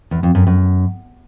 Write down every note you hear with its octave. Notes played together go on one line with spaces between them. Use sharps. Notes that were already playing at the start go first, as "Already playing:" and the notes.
E2
F2
F#2
F#2